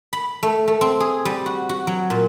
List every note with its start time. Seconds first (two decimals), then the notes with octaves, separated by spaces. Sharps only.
0.13 B5
0.43 A3
0.68 A3
0.81 C4
1.00 G#4
1.25 G3
1.46 F#4
1.69 F#4
1.87 F#3
2.10 A#2